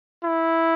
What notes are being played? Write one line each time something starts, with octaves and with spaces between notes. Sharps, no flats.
E4